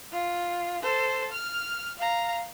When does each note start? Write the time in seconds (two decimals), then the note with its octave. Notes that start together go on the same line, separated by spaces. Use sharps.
0.12 F4
0.82 A4 C5
1.32 F6
1.97 F5 A#5